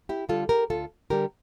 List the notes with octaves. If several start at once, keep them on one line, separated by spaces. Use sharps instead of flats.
E4 G4
D3 G3 F4 A4
G4 A#4
D2 F4 A4
D3 G3 G4 A#4